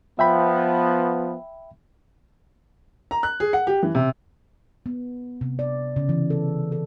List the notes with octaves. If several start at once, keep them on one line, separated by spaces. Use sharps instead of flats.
F3 B3 E5 G5 B5
A#5
F#6
G#4
F#5
G4
E3
C3
B3
C3
D5
C#3
E3
A4
A4